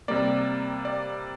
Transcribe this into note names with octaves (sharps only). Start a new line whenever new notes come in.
C3 G3 A#3 D5
D5